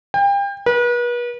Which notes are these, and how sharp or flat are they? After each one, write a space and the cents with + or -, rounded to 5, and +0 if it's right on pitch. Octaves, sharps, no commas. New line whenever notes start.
G5 +35
B4 -40